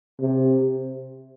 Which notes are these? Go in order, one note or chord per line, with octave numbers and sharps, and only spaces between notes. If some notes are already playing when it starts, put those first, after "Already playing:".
C3